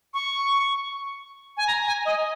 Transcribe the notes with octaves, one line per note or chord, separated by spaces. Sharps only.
C#6
G#5
A#5
G#5
D#5